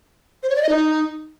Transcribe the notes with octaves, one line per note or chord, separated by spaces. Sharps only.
C5
C#5
D5
D#5
D#4